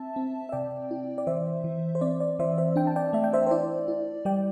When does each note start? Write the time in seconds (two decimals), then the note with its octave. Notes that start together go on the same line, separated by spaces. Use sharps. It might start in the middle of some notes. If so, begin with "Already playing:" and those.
Already playing: C4 E5 A5
0.16 C4
0.49 E5
0.52 C3 D5 G5
0.91 E4
1.18 D5
1.27 E3 C5 E5
1.64 E3
1.95 C5
2.01 C4 D5
2.20 D5
2.39 E3 C5 E5
2.58 C5 E5
2.76 D4 G5
2.87 A5
2.96 D5 G5
3.13 A3 E5
3.24 G5
3.33 C5 E5
3.47 C5
3.51 E4 D5
3.88 E4
4.25 G3 D5 G5